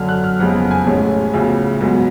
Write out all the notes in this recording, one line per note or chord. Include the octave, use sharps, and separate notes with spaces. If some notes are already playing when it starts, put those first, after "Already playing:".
Already playing: F#2 D3 F#3 F6
F#6
F6
F#1 F2 C#3 G#3 B3 F#5
G#5
G#5
A1 A2 G#3 C#4
D2 C#3 F3 B3
G#2 F#3 B3